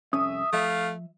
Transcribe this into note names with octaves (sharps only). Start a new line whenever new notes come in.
C2 F2 C#4 E5 D#6
F3 A3 E5 F5